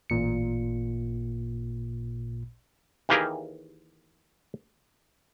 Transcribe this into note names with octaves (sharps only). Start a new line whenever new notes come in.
A1 A#2 C#7
D#2 E3 A#3 G4 G#4 A#4